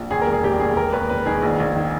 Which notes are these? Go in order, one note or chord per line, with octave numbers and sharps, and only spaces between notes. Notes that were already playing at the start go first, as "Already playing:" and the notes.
Already playing: A#1
D#2 G#4
A#4
E1
G#4
E1 G4
E1 G#4
E1 A#4
D#2 B4
E1 B4
D#3 G#4
A#1
A#1
D#3